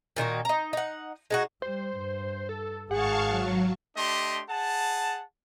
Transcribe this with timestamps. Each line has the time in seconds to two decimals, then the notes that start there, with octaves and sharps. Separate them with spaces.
0.16 A#2 D#3 D#4 F#4
0.45 D#4 A#5
0.73 D#4 F#5
1.30 G#3 D#4 F#4
1.62 G3 C5
1.97 G2
2.49 A4
2.91 G#1 G#4 F5 F#5 A5 C#6
3.29 F#3
3.97 A3 D4 G4 D#5 C6
4.49 G#4 F#5 A5